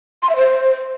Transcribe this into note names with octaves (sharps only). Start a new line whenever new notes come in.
C6
E5
C5